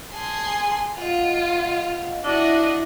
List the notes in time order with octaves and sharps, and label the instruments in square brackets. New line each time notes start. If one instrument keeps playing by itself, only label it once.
[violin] G#4 C6 [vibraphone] A5
[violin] F4 [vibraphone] D#5 F5 F#5
[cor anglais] D4 [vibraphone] E4 E5 [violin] F#4 D#5